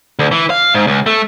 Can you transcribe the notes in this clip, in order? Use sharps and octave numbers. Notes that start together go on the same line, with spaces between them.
D2
E3
F5
G#2
C#2
A3